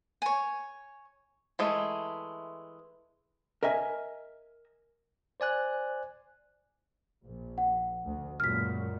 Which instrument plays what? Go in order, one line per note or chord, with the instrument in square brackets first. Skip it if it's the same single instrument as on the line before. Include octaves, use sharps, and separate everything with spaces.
[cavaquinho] C#5 G#5
[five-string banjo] E3 G#3 A3
[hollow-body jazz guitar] A#4 D#5 E5 G#5
[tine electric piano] C5 D5 G#5 F#6
[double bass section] A#1
[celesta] F#5
[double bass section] D2
[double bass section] C#2 F#2 A#2 [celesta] F6 B6